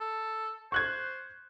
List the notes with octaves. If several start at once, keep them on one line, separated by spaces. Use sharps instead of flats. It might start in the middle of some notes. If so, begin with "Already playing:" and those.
A4
C5 C#6 F#6 G#6